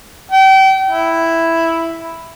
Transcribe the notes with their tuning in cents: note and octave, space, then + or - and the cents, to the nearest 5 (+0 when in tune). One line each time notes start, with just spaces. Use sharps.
G5 -35
E4 +0